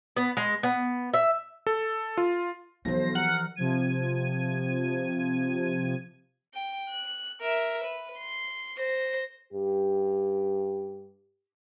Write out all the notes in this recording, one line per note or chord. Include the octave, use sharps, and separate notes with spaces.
B3
G#3
B3
E5
A4
F4
B1 E3 F3 A4 C5 A#6
C2 F#5 A#5 F6
C3 F3 G#6 D#7
G5
F#6
A#4 E5
B4
C6
C5 A#6
G2 G4